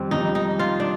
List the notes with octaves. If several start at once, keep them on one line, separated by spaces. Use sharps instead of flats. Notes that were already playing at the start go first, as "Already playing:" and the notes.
Already playing: F2 D#3 G3 C4
F2 D#3 G3 D#4
D#4
F4
D4